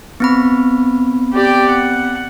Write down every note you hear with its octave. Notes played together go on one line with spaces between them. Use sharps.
B3 C4 B5
G4 D5 G5
F#5